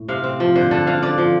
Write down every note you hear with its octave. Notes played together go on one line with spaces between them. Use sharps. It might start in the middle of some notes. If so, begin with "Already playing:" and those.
Already playing: A2
C3 F5
C4
F3
D3 C5
D3 A4
D3 F5
D3 D5
F3